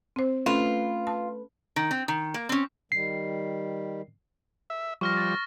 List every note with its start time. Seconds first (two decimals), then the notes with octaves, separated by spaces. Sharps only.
0.16 C4 C5
0.46 A3 C#4 F4 B4
1.07 A5
1.76 D#3
1.91 C4
2.08 D#3
2.34 A#3
2.49 C4 C#4
2.92 D#3 G3 C7
4.70 E5
5.01 F3 G3 C#6 F6 A#6
5.17 A6